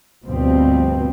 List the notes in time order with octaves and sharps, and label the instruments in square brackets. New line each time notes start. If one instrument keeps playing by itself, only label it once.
[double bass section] D2 B2 F3 G3 C4